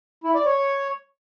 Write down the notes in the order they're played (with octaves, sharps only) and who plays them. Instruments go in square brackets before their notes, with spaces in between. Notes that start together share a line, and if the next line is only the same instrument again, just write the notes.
[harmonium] E4
D5
C#5